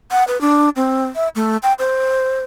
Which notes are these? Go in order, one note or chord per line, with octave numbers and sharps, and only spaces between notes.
F#5
B4
D4
C4
E5
A3
G5
C5